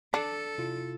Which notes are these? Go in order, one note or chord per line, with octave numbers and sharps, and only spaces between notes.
D4 A4
C3 E4 F4